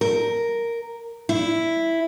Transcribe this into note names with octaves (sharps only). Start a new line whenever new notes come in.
A#4
E4